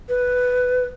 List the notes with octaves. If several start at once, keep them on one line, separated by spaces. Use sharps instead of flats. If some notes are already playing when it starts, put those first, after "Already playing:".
B4